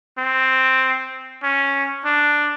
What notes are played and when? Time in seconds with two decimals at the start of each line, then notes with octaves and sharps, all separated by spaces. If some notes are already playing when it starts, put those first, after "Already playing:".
0.19 C4
1.43 C#4
2.05 D4